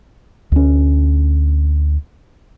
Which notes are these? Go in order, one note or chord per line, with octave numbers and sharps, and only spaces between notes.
D2 C#4